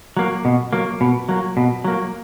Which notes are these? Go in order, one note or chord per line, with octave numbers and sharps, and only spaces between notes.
F#3 A#3
B2
F#3 A#3
B2
F#3 A#3
B2
F#3 A#3